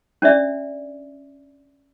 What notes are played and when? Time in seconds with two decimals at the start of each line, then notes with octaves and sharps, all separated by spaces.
0.22 C#4 D4 D5 E5